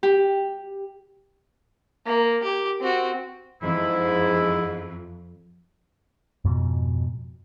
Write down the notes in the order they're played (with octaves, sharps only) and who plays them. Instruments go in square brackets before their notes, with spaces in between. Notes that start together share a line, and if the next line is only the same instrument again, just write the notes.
[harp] G4
[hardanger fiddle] A#3
G4
C4 F#4
[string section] F2 [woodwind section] G#2 E4
[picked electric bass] F2 G#2 B2